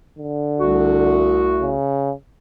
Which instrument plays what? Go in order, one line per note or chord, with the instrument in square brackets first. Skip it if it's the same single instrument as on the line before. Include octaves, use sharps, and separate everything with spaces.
[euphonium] D3
[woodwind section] C2 A3 F#4
[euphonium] C#3